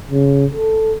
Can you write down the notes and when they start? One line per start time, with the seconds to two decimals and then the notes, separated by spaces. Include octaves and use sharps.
0.10 C#3
0.55 A4